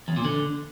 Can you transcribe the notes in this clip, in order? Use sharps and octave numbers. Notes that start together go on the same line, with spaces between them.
E2
A#2
D3